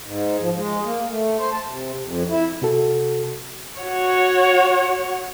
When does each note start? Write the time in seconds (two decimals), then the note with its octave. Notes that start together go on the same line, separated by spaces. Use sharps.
0.04 G#2
0.40 F3
0.56 G#3
0.84 A#3
1.09 A3
1.38 C5
1.52 A5
1.69 C3
2.03 F2
2.30 E4
2.62 C3 F#4 A4
3.81 F#4 C#5